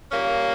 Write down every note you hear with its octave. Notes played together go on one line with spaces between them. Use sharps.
A#2 G3 A#3 C#4